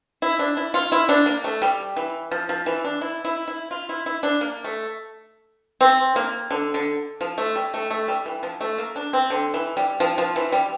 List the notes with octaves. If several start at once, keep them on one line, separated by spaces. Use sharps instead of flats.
E4
D4
E4
F4
E4
D4
A#3
A3
G3
E3
F3
F3
E3
D4
E4
E4
E4
F4
E4
E4
D4
A#3
A3
C4
A#3
D3
D3
F3
A3
G3
A3
A3
G3
E3
F3
A3
A#3
D4
C4
D3
E3
G3
F3
F3
E3
G3